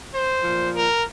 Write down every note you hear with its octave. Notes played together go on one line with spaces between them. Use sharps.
C5
A#2 F3
A#4